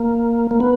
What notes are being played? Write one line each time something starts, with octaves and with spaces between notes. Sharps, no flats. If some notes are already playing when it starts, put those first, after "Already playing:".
Already playing: A#3
A#3
B3